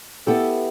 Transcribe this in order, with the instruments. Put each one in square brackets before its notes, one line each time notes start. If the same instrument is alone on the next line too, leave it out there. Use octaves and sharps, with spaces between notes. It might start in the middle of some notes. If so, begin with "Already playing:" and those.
[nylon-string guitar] B3 E4 G4 [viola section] A4